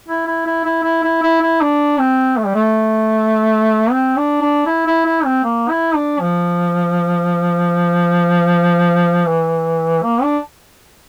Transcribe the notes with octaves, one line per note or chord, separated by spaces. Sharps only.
E4
E4
E4
E4
E4
E4
E4
E4
D4
C4
A3
G3
A3
C4
D4
D4
E4
E4
E4
C4
A#3
E4
D4
F3
E3
A#3
D4